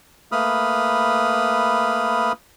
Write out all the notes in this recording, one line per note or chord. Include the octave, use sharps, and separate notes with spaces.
A3 A#3 B4 B5 D#6 F6